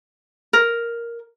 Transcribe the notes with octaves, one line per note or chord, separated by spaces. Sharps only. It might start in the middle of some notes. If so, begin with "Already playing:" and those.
A#4